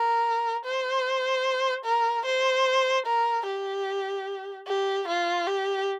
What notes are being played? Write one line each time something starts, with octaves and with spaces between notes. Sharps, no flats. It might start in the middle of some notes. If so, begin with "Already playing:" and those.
Already playing: A#4
C5
A#4
C5
A#4
G4
G4
F4
G4